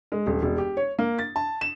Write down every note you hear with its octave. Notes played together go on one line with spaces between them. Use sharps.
G#3
D#1
E1
G4
C#5
A#3
A6
A5
E7